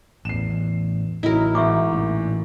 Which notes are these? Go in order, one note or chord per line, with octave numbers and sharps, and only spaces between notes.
A1 E2 C7 E7
A1 F#3 D#4 E4 A#4
G#2 B2 E3 E5 C#6 D6
A1 A#2